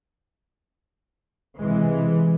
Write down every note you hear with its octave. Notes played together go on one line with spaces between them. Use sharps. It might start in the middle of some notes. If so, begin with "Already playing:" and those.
C3 E3 G#3